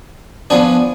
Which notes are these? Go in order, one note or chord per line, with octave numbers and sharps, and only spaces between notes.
F3 B3 D4 G#5